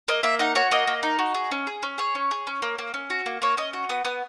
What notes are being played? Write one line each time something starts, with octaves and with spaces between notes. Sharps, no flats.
A#3 D#5
A#3 E5
D#4 F#5
F#4 C#5
A#3 D#5
A#3
D#4
F#4
G#4
C#4
G#4
C#4
G#4 C#5
C#4
G#4
C#4
A#3
A#3
C#4
F#4
A#3
A#3 C#5
C#4 D#5
F#4
B3 D#6
B3 D#6